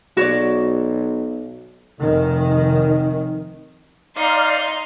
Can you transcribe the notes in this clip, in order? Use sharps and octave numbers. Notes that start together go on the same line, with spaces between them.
B1 F#4 C#5 D5
F1 D#3
D#4 D5 F5 A#5 C6